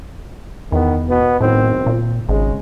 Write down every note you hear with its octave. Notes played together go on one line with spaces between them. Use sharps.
E2 D#3 B3
B2 B3
B1 A2 D#3 C4
A#2
G#1 C#3 G#3